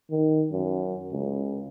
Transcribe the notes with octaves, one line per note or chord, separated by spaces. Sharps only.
D#3
F#2
C#2